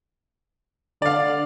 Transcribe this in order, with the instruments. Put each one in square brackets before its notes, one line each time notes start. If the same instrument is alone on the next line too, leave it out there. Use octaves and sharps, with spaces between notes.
[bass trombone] D3 [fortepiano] D5 F5